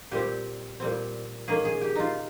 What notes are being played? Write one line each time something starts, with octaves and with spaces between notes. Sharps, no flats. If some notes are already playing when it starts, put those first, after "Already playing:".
A#2 G3 C4 G4
A#2 G3 C4
D#3 A#3 C#4 G#4
G#4
G4
D#4 F4